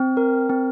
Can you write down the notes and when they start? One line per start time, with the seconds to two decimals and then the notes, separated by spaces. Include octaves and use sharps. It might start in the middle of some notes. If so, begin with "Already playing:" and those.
Already playing: C4
0.17 A#4
0.49 C4